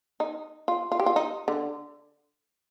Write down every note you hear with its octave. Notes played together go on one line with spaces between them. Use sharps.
D#4
F4
F4
G4
F4
D#4
D3